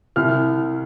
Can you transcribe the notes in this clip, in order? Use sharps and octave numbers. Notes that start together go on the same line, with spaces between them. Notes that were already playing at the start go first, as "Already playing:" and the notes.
C2 F6